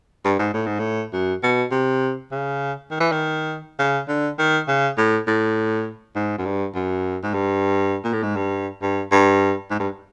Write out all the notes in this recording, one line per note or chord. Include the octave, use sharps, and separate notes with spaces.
G2
G#2
A2
G#2
A2
F#2
B2
C3
C#3
D#3
E3
D#3
C#3
D3
D#3
C#3
A2
A2
G#2
F#2
G2
F#2
G#2
G2
A#2
A2
G#2
G2
G2
G2
G#2
G2